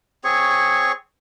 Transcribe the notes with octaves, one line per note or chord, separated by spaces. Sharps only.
C4 G#4 C#5 C#6